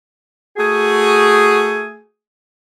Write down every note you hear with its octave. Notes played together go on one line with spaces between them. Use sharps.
A3 F#4 G#4